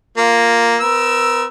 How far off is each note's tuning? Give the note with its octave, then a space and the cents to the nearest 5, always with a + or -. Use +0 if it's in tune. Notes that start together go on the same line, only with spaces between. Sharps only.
A#3 +0 F4 +0
B3 +45 A#4 +20 E6 +10